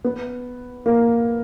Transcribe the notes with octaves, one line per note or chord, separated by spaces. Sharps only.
B3
A#3